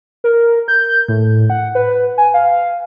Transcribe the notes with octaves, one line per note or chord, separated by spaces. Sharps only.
A#4
G6
A2
F#5
B4
G#5
F5